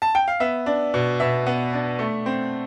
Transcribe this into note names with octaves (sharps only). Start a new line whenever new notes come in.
A5
G5
F5
B3 E5
D4
B2
B2 E5
B3
D4
A3
C4